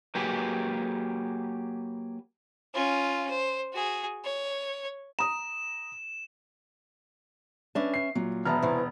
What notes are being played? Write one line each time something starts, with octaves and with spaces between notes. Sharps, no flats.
F#3 A#3 G4 G#4 B4
C#4 F4
C5
F#4 G#4
C#5
A#5 D#6 E7
C#4 D4 B4 E5
C7
A#2 F#3
E1 B3 E5 A5 A#5 F6
C3 E3